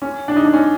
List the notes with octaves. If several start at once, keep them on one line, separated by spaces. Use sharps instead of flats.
C#4
D4
D#4
D4
C#4